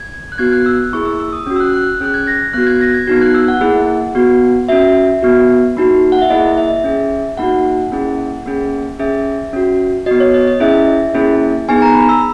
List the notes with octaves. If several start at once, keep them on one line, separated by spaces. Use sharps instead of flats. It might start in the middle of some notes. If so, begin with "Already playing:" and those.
Already playing: G#6
F#6
B3 F#4 G#6
F#6
E6
A#3 E4 G#4 C#6
E6
E6
D#6
C#4 F#4
E6
F#6
F#6
C#4 G#4 F#6
G#6
A#6
B3 F#4 F#6
G#6
A#6
G#6
B3 D#4 F#4 G#6
F#6
E6
F#5
A#3 E4 G#4
B3 F#4
C#4 F#4 E5
B3 F#4
A#3 D#4 F#4
F#5
E5
A#3 E4 G#4 D#5
E5
C#4 G#4
A#3 D#4 F#4 F#5
A#3 C#4 E4 G#4
A#3 C#4 G#4
C#4 G#4 E5
C#4 F#4
B3 F#4 D#5
C#5
D#5
D#5
C#4 E4 G#4 E5
A#3 C#4 E4 G#4
B3 D#4 G#4 G#5
A#5
B5
E6